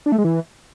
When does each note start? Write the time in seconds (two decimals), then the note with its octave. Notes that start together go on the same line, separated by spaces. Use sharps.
0.06 D4
0.12 A3
0.18 G#3
0.24 E3